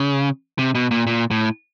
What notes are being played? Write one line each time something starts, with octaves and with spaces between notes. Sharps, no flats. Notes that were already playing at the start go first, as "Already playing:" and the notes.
Already playing: C#3
C3
B2
A#2
A#2
A2